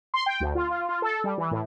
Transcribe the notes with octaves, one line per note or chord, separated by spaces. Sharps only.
C6
G5
D2
F4
F4
F4
A4
G3
E3
A2